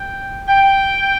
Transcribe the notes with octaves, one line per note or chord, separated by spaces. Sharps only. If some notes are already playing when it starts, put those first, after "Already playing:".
Already playing: G5
G5